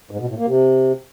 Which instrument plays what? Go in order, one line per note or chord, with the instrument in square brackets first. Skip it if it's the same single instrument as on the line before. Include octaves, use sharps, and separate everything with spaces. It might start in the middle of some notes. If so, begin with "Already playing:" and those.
[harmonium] G#2
B2
A2
A#3
C3